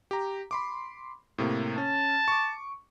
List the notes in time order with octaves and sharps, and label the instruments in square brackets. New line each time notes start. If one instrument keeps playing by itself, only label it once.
[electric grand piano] G4 A#5
B5 C6 D6
A2 C3 A#3
[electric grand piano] C#4 [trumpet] A5
[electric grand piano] C#6 D6